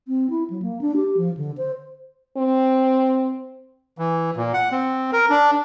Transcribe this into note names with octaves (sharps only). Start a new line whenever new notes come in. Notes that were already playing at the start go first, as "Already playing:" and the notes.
C4
E4
F#3
A#3
D4
G4
F3
D3
C5
C4
E3
A#2
F#5
C4
A#4
D4